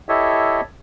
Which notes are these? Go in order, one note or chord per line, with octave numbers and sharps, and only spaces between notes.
E4 G4 A4 C#5 D#5 E5